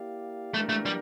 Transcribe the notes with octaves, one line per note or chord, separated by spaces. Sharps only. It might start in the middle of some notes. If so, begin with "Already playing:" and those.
Already playing: A#3 E4 G4 D5 F5
E3 A3 A#3 D4 G4 A#4
A3
G3